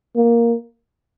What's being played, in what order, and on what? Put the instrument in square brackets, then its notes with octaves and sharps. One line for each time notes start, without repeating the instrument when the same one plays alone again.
[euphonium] A#3